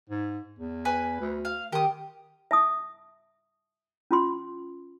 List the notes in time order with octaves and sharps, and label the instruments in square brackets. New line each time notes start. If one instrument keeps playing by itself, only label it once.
[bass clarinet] G#2
E2
[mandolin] B4 G#5
[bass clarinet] D2
[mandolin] F5
[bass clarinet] D#3 [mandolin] G4 D#6
[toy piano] E5 A5 D#6
C#4 F4 C6